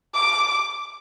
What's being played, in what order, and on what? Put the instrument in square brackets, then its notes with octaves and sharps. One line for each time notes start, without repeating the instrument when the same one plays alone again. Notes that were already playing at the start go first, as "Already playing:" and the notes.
[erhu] D6